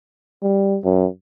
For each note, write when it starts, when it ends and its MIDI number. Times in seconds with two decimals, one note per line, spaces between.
0.42 0.78 55
0.84 1.07 42